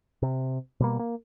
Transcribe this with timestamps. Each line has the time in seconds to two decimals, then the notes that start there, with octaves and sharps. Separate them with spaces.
0.22 C3
0.80 B2 G3 A#3
0.99 A#3